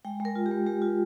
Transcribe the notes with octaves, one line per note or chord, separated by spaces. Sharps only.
G#3 G5
G#3 A#4
F4
G4
G#3
G#3 G4
F4